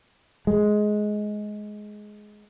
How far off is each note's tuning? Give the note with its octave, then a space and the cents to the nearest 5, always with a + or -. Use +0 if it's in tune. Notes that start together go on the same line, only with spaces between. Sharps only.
G#3 +15